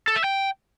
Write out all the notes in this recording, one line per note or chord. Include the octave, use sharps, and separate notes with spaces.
A4
E5
G5